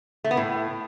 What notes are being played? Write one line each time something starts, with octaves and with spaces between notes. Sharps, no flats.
A3
B3
A2